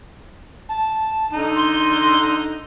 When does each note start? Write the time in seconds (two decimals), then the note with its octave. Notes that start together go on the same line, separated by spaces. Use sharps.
0.69 A5
1.33 D3 D#4
1.56 C6